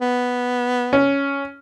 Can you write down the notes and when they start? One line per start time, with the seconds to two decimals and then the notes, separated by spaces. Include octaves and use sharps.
0.01 B3
0.93 C#4